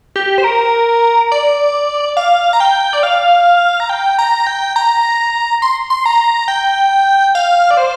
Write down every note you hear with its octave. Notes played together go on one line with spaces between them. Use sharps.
G4
C5
A#4
D5
F5
A#5
G5
D5
F5
A#5
G5
A#5
G5
A#5
C6
C6
A#5
G5
F5
D5
C5